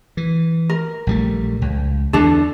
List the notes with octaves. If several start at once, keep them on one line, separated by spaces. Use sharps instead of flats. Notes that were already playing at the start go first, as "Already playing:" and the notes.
E3
A#4
A#1 G3 A3
C#2
E2 D3 E3 D4 A4